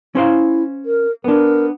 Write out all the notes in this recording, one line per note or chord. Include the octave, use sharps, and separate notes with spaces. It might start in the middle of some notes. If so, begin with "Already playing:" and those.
C#4 E4 C5 F5
A#4
B3 D4 A#4